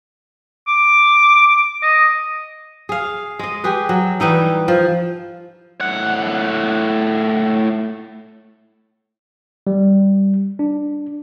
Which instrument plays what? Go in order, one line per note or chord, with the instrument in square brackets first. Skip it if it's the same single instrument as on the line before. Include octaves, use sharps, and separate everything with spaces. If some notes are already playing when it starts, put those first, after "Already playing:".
[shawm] D6
D#5
[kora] G#4 F5
G#3 D#5
G4 G#4 B4
F#3
E3 G3 D#4 E4
F3
[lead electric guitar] A2 F#5
[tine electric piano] G3
D4